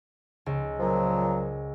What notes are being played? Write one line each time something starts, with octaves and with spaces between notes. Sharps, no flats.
C#2
A#2 F3 F#3